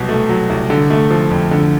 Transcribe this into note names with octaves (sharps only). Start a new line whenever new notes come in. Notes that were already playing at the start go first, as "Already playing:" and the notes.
Already playing: C2 B2 F#3
A3
F#3
C2
D3
A3
F3
F2
D3